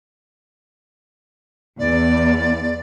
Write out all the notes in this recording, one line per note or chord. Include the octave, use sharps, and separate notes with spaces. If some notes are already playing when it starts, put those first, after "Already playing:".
E2 D5